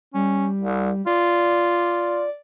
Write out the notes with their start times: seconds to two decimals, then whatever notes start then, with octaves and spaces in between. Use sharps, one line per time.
0.14 G3 C#4
0.61 C2
1.06 F4 D5